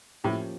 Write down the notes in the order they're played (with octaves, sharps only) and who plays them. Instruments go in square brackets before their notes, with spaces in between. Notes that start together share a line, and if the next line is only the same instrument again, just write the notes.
[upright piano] A2 [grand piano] F3 A#3 C#4 G4